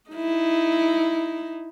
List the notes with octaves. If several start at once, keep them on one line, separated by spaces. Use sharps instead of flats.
D#4 E4